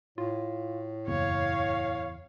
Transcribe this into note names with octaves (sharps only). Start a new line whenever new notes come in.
A2 F4
F#1 E2 C#5 F5